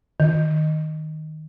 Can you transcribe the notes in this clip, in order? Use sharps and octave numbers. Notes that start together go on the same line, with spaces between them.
D#3